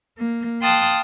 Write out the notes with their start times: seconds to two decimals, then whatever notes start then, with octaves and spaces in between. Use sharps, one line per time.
0.17 A#3
0.62 F5 G5 A5 C6 D#6 F#6